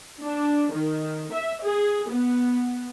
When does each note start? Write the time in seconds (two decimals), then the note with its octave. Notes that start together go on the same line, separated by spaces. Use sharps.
0.21 D4
0.72 D#3
1.33 E5
1.63 G#4
2.10 B3